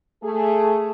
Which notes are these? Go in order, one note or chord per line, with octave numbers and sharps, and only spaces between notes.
A3 G#4